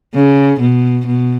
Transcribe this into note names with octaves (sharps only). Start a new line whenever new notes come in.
C#3
B2
B2